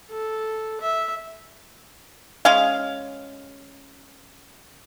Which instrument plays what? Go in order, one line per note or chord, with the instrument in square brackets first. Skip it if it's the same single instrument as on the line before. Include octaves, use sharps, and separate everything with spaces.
[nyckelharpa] A4
E5
[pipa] G#3 C#4 F5